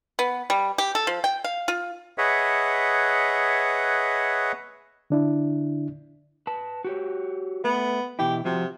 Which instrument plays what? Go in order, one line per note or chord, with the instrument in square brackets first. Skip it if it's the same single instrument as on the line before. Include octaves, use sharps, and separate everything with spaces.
[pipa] B3
G3
G4
A4
F3
G5
F5
F4
[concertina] G#4 B4 C#5 D#5 E5 F#5
[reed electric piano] D3 D4 E4
[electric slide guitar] B4 A5
F#4 G4 C#5
[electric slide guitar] A3 [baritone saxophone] B3
[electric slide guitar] B2 E3 E4 [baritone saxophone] G4
[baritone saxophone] C3 [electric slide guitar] F3 F4 F#4